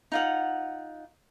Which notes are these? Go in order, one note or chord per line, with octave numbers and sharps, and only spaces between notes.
D#4 F4 F#5